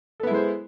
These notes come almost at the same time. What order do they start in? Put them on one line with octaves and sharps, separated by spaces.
A4 B3 E4 G#3 C5